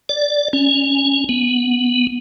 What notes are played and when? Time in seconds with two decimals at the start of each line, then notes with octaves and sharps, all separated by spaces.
0.09 D5
0.53 C#4
1.29 B3